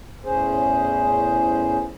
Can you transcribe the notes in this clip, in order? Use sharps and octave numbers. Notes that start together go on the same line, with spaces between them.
E2 A2 C#4 G#4 C5